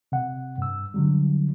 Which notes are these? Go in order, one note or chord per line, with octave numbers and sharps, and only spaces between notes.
C3 F#5
G2 E6
D3 F#3 G3